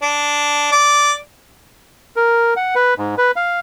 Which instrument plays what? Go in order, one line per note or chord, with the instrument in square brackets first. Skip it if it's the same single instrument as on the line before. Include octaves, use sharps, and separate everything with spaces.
[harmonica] D4
D5
[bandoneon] A#4
F#5
B4
G#2
B4
F5